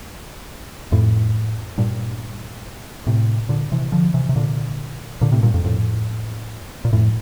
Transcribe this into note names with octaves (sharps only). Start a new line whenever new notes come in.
F2 A2
G2 A#2
A2 C3
A#2 D3
C3 E3
D3 F3
C3 E3
C3
A#2 D3
A#2 D3
A2 C3
G2 A#2
F2
F2 A2
A#2
F2 A2